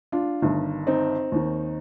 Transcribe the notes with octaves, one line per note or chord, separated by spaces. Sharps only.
D4 F4
G1 G2 D#3
C4 D#4
D#2 D#3